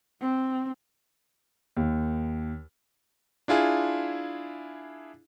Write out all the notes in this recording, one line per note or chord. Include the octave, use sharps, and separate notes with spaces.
C4
D#2
D4 E4 F4 G#4